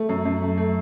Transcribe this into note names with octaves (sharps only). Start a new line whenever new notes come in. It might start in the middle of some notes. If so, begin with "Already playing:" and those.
Already playing: A3
F#2
F#2
A3
A3